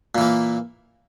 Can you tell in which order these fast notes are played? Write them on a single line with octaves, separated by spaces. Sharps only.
A#2 E3 A#3